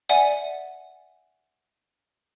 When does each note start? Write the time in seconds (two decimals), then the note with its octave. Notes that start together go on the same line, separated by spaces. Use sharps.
0.09 D5 E5 F#5 G#5